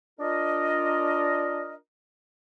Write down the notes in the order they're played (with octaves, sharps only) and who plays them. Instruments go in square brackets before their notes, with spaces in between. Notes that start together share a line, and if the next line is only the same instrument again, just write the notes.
[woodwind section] D4 F4 A#4 D#5